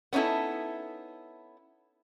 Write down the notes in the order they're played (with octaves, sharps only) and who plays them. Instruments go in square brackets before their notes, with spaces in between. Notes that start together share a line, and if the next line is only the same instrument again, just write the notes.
[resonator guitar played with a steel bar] B3 C#4 D#4 E4 A4